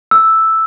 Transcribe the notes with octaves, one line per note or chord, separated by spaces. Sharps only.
E6